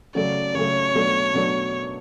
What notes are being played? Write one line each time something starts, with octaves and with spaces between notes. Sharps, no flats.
C#3 F#3 A3 D5
C#3 F#3 A3 C#5
B2 F#3 A3 D4
B2 F#3 A3 D4